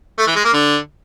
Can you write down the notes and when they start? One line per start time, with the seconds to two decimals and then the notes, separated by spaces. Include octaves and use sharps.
0.18 A3
0.27 E3
0.36 G#3
0.45 A#3
0.54 D3